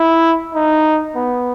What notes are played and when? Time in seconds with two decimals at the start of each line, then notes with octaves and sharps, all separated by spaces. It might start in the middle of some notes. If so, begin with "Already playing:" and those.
Already playing: E4
0.54 D#4
1.16 B3